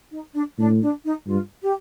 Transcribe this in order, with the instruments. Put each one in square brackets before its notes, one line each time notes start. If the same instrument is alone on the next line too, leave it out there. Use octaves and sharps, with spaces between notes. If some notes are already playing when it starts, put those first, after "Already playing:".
[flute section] D#4
D4
[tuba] A2 [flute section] D4
[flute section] D4
D#4
[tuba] G2 [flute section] F4
[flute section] G4